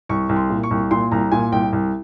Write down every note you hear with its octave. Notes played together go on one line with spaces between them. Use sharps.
C2 C#6
C2
C6
A#2
C#6
C2
A#2 C6
C2 A#5
A#2 G#5
C2 G5
C2